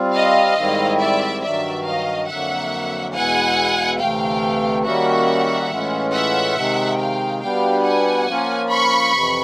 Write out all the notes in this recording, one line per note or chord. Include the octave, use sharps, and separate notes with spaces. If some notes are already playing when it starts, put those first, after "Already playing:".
Already playing: G3 C4 F4
D#5 F5
G#2 D#3 G3 C4 E4
D5 E5
G2 D#3 F#3 D5 E5
D#5 F5
F2 D3 F#3 A#3 E5 F#5
E2 B2 G#3 B3 E4 F#5 G#5
D2 C3 E3 A3 F5 G5
D#3 G3 A#3 C#4 F#4 E5 F#5
A2 E3 G#3 C#4 F4
E5 F#5
C3 D#3 G#3
F5 G5
B2 G3 B3 D4 G4 F5 G5
F#5 G#5
F3 A#3 C#4 F4
B5 C#6
F2 C3 E3